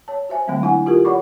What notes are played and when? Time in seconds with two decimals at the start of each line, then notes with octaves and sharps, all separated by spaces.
0.08 C#5 A5
0.29 F#4 C5 E5 G#5
0.48 D3 F#3 G#3 A3 C4
0.62 D4 E4 F#5 G#5
0.86 E4 F4 G4 A4 A#4
1.05 C#5 D5 F#5 B5 C#6 D6